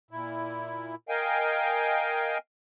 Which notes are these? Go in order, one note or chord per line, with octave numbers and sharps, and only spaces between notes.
A#2 E4
A#4 D#5 F5 G5 G#5